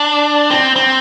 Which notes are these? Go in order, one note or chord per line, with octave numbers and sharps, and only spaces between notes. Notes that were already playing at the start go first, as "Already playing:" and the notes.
Already playing: D4
C4
C4